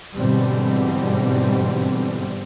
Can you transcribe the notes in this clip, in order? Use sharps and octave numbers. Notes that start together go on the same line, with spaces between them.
G#2 B2 D3 E3 G3 C4